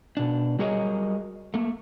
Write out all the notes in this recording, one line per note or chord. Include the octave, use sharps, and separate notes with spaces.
B2 D4
F#3 G3 G#4 A#4 C#5 D#5
A3 A#3